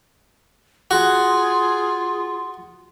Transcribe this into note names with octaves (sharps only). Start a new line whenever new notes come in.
F4 F#4 G#4